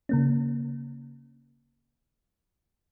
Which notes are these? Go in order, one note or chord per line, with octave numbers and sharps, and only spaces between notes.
C#3 A#3 C#4